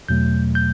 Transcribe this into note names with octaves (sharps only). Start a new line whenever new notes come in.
E2 B2 F#3 A3 G6
G6